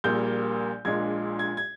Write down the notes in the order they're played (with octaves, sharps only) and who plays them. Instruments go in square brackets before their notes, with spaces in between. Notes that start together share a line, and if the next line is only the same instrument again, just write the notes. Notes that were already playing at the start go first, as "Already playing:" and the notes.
[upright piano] A#1 A#2 G3 A#3 G6
A#1 A#2 G#3 D4 F4 G#6
G#6
G#6